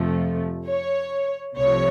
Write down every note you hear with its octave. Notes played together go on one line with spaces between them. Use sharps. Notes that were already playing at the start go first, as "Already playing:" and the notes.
Already playing: F2 C3 F3 A3
C#5
C2 C3 F3 A3 C#5